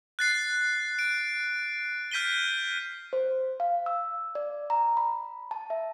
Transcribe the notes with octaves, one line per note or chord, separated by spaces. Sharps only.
F#6 A6 C7
D7
F6 G6 B6 D#7 G7
C5
F5
E6
D5
A#5
B5
A5
E5